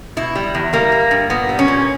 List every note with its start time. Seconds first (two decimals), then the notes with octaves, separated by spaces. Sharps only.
0.17 B2 E4
0.36 G3
0.55 E2
0.73 G3 A#3
0.92 G3
1.11 G2
1.30 A#2 B3
1.49 G3
1.59 C#4
1.68 A#2